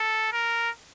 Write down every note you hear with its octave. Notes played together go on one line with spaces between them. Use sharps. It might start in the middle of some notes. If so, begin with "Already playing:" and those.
Already playing: A4
A#4